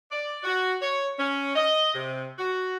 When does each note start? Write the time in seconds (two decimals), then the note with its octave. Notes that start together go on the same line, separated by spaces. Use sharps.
0.11 D5
0.44 F#4
0.82 C#5
1.19 C#4
1.55 D#5
1.94 C3
2.39 F#4